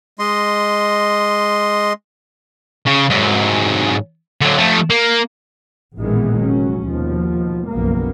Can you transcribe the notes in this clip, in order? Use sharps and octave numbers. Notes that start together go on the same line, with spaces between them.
G#3 D#5 C6
C#3
G#2 F#3
D3 F#3
F3 A3
A#3
A1 A#2 D#3 E3 G#3 B3
F1 F#3 C#4
D#2 B2 F3
F#1 B1 F2 A#3 B3